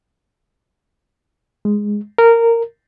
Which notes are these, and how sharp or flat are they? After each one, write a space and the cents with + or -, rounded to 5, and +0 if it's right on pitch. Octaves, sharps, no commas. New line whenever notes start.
G#3 -5
A#4 -15